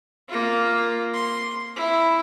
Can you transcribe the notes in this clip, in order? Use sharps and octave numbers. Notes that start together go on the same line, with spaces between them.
A#3 F4
C6
E4